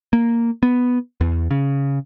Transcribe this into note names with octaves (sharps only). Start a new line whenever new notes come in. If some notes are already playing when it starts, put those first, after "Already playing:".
A#3
B3
E2
C#3